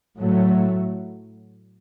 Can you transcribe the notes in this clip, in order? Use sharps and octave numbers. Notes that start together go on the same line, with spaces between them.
A2 F#3 A3